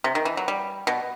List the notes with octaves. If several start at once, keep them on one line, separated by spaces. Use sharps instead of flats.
C3
D#3
E3
F#3
G3
B2